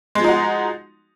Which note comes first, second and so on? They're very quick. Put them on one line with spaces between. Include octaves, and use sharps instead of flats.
G#3 F3 D#4 F#4